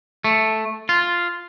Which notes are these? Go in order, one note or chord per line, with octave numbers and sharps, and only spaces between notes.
A3
F4